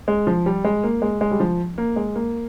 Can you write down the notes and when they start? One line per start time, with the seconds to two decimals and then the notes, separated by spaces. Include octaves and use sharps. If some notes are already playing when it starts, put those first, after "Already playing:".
0.08 G#3
0.27 F3
0.46 G3
0.64 G#3
0.84 A#3
1.02 G#3
1.21 G#3
1.31 G3
1.40 F3
1.78 A#3
1.96 G#3
2.15 A#3